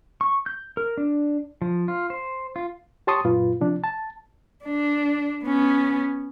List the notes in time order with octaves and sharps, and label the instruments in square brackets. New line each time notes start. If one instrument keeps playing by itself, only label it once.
[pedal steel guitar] C#6
G6
A#4
D4
F3
F4
C5
F4
[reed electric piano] G4 C#5 A5 C6 C#6 D#6
F#2 A#2 F4 B4
C3 F3 D4
A5
[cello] D4
B3 C#4